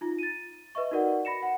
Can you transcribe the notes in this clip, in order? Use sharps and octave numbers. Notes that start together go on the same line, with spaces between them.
D#4 F4
A6 D#7
B4 D#5 E5 C#6
D#4 F#4 A#4 D5 F#5
B5 A#6 C#7 E7
F#5